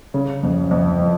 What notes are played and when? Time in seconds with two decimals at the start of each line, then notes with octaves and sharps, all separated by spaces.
0.14 C#3
0.43 F2
0.71 F2
0.99 F3